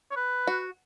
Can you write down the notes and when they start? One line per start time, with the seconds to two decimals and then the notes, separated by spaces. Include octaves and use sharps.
0.11 C#5
0.16 B4
0.47 F#4